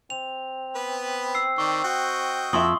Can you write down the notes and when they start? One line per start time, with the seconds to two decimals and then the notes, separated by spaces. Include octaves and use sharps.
0.10 C4 F7
0.75 B3 B4
1.35 E6 C7
1.58 D#3 D5 C#6
1.84 F#4 D#5 G5
2.53 F2 E5 C6 C#6 D#6